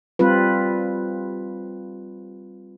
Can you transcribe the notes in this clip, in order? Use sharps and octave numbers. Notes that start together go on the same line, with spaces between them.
G3 C4 F4 B4